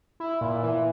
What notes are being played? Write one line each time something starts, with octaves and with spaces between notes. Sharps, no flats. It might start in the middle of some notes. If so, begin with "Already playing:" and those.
E4
A#2
E3